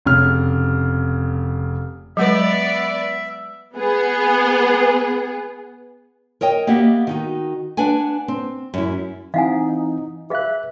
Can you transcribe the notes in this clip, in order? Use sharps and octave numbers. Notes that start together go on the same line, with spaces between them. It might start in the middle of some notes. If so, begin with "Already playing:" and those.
F1 C#3 F6
F#3 G#3 B3 B4 D5 E5
B3 G#4
A#4 C#5 D#5 G5
A#3 B3 G4 D#5 E5 F#5
D#3 D#4 F#4
D4 B4 F#5 G#5
C4
F#2 E4
E3 C4 D#4 E4 F5 F#5 G#5
G#4 B4 E5 F5 F#6